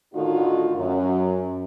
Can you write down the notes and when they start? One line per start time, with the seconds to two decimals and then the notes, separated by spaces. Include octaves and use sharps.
0.14 A2 D3 D#3 D#4 F4 F#4
0.76 F#2